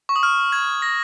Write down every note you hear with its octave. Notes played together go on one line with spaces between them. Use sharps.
C#6
D#6
F6
G#6
A#6